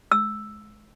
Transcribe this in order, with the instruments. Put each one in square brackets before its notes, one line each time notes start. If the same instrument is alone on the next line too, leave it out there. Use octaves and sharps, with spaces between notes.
[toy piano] E6